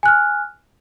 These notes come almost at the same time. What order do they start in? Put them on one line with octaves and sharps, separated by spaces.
G#5 F#6 F6